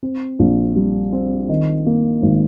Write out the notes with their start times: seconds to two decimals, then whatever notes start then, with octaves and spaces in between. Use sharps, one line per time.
0.03 C4
0.39 A#1
0.76 G3
1.13 C4
1.49 D#3
1.86 A#3
2.22 G#1